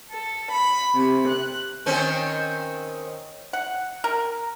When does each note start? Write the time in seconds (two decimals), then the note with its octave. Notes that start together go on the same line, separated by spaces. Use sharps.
0.11 A4
0.53 B5
0.94 C3
1.27 F#6
1.86 D#3 C4 C#4
3.53 F#5
4.04 A#4